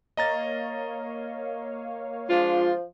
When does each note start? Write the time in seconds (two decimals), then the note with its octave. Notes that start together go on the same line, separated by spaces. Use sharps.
0.17 A#3 C#5 D#5 F5 A#5 A6
2.29 F3 G#3 D4 F4